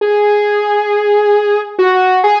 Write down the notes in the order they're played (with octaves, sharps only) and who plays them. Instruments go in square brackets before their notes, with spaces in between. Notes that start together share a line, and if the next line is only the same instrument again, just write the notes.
[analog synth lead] G#4
F#4
G#4